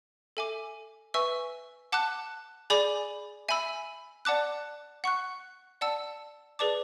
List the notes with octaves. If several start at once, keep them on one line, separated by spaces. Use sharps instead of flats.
A4 E5 G#5 D6
B4 E5 G#5 C#6 E6
F#5 A5 D6 F#6
G#4 D5 G#5 B5 D6
E5 G#5 B5 E6
D5 F#5 A5 D6 F#6
F#5 C#6 F#6
D5 F#5 A5 E6
G#4 B4 D5 A5 D6